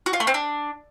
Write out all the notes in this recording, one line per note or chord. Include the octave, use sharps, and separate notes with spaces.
F#4
F4
A3
C4
D4